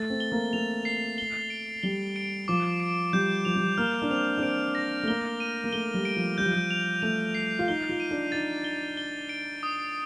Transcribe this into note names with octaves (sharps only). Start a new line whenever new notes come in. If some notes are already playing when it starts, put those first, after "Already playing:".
Already playing: A3 A6
C4
G7
A#3
A3 F7
C7
G7
D7
G3 G7
D7
F3 D6
D7
G3 G6
F3 F7
G3
F3
A#3 F6
D4
C4 F7
D4
C4 D7
A#6
A3
A#3 G7
D#7
A#3
A3 G7
G3
D7
F3
G3 G6
F3
G3
F7
A3 F7
C7
F4
D#4 G7
F4
D#7
D4
D#4 A6
G7
G7
D7
D#6